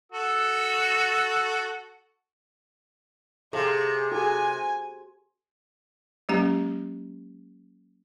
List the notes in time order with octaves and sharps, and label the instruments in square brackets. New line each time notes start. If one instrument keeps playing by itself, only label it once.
[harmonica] F#4 A4 E6
[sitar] C3 [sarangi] G#4 [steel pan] A4 F5 C6
[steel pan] F#4 G#4 A4 [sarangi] G#5
[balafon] F#3 G#3 A#3 C#4 G4 A#5